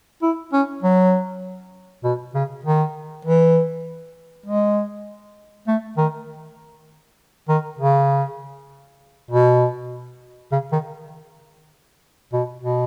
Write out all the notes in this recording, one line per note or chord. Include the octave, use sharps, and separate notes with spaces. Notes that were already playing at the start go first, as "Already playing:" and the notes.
E4
C#4
F#3
B2
C#3
D#3
E3
G#3
A3
D#3
D#3
C#3
B2
C#3
D#3
B2
B2